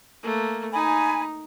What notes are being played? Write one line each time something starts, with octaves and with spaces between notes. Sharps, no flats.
A3 A#3
D#4 G#5 B5